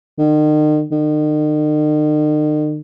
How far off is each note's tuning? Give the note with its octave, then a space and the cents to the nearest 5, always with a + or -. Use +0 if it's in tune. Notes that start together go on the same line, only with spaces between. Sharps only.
D#3 -40
D#3 -45